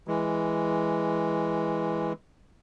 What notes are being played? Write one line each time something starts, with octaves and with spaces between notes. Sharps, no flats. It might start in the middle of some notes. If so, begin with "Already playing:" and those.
E3 G#3